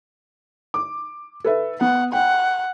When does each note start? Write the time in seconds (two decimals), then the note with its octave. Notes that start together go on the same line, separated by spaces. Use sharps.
0.74 D6
1.44 A4 B4 E5
1.81 B3 F#5
2.13 F#5 G5